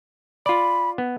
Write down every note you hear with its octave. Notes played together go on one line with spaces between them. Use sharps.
F4 D5 B5
B3